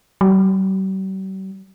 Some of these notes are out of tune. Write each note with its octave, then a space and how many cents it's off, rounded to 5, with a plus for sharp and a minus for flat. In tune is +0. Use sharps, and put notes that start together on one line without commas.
G3 -45